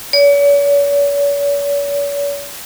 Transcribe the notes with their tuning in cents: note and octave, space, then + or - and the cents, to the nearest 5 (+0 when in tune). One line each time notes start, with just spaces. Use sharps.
C#5 +45